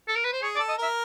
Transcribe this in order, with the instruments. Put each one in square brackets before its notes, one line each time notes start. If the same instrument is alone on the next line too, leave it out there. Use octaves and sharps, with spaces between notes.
[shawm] A4
A#4
B4
C5
[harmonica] G#4 [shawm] C#5
[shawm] D5
[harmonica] A4
[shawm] D#5
[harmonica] A#4 [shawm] E5